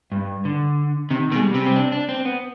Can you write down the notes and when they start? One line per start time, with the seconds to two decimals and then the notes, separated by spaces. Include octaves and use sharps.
0.12 G2
0.45 D3
1.11 C3 D#3
1.32 B2
1.35 G#3
1.43 G3
1.54 C3
1.66 C4
1.76 D4
1.92 D4
2.09 C4
2.25 B3